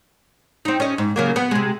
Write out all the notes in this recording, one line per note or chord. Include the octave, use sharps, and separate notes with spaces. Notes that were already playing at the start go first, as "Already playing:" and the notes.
C4 D#4
C#4 D#5
G#2
C#3 F#3 A#3
B3
C3 G#3